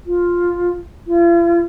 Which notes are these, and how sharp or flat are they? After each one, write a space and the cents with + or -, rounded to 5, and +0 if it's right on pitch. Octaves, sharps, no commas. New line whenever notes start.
F4 +5
F4 -40